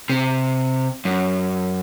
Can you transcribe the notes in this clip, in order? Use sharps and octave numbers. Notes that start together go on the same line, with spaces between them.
C3
F#2